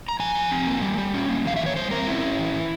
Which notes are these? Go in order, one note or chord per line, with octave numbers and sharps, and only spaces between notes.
A#5
F3 G#5
F3
C4
A#3
G3
G3
C#4
A#3
E3 F5
E5
E3
C#5
G3 C5
C4 A#4
C#4 E4
C#4
E3
E3